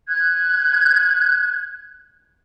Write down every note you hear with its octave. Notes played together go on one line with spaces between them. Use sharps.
F#6 G#6